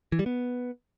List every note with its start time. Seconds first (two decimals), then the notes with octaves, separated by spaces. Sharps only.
0.12 E3
0.19 G3
0.26 B3